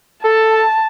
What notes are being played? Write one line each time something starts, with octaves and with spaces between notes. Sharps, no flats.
A4 A5